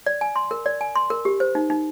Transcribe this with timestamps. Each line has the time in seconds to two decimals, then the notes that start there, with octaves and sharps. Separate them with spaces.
0.06 D5
0.21 G#5
0.36 C6
0.51 A#4
0.66 D5
0.81 G#5
0.96 C6
1.10 A#4
1.25 G4
1.40 C5
1.55 D#4
1.70 D#4